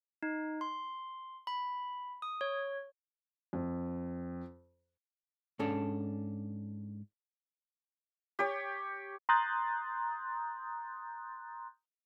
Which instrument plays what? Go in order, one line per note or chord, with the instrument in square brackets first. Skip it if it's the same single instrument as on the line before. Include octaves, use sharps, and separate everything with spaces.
[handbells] D#4
C6
B5
D#6
C#5
[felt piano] F2
[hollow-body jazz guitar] G#2 C#4 D4 A4
[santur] G4 C#5
[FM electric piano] A#5 C6 D#6 F#6 G6 A6